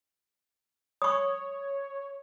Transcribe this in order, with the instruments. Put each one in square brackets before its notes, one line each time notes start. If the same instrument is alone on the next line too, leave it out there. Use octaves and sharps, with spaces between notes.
[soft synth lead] C#5 [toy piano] C#6 D#6